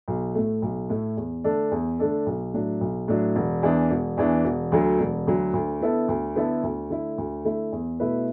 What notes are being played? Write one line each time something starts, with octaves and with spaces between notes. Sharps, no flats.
B1
A2 A3
B1
A2 A3
E2
D3 A3 D4 A4
E2
D3 A3 D4 A4
B1
A2 F#3 D4
B1
A2 F#3 D4
E1
E2 E3 D4
E1
E2 E3 D4
E1
D2 D3 F#3
E1
D2 D3 F#3
D2
D3 B3 E4 A4
D2
D3 B3 E4 A4
D2
D3 A3 E4
D2
D3 A3 E4
E2
B2 A3 E4 B4